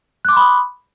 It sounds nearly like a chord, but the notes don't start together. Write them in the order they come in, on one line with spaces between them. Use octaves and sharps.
F#6 D6 C6 B5 D#6